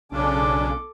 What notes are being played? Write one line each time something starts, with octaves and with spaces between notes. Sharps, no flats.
B1 C#3 C#4 D4 A4 D6